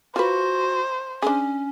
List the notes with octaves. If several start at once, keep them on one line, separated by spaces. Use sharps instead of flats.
F4 F#4 B4 C5
C#4 D4 G#4